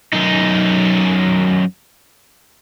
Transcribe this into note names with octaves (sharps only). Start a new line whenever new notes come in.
F#2 D#4